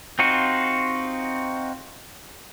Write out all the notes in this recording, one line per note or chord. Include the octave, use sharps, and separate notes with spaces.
C4 D#4 F4 F#4